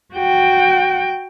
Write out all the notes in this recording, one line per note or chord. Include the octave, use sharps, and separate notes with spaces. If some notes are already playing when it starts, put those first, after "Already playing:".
F#4 G5